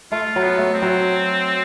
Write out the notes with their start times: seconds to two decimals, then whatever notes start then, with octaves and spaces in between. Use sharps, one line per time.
0.12 A3 F4
0.36 F#3
0.43 B3
0.58 A3
0.74 C4
0.82 F#3